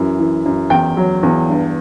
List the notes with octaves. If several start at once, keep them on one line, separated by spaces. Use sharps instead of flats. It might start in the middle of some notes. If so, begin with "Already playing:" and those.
Already playing: F#2 E3
E3
F#2
E2 G5
F#3
E2
G2